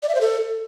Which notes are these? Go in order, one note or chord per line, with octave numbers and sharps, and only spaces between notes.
D5
E5
C5
A4